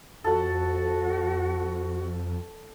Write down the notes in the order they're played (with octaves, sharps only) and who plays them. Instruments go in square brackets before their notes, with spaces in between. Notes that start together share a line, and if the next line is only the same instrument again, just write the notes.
[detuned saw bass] F2 [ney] F#4 [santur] A4 F#5